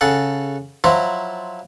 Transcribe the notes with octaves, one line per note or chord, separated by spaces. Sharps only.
C#3 G#4 A4 F#5
F3 F#3 E4 C5 A#5